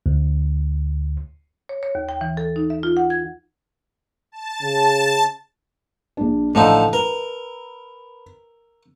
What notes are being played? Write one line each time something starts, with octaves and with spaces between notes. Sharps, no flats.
D2
C#5
C#5
D#2
G5
E3
A4
D#4
E5
F4
F#5
G#6
A5
C#3
A#1 D4
A1 D3 F3 A3 D#4 E6
A#4 B4